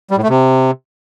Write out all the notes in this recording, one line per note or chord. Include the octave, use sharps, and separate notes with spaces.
G3
A2
A3
C3